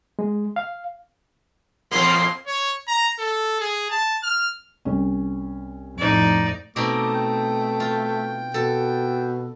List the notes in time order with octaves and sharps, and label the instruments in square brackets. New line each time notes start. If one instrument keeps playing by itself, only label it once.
[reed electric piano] G#3
F5
[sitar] E2 A#2 A#3 [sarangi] C6
[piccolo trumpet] C#5
A#5
A4
G#4
A5
F6
[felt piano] C2 C#4
[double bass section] F2 A2 [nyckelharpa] D#4 D5
[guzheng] B2 C4 D#4 [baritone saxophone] A3 [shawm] D6
[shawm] G5
[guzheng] F4
[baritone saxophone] B2 [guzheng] A4